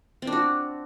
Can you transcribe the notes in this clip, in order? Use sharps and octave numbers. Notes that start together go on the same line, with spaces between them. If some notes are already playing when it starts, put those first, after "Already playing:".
C4
D4
F#4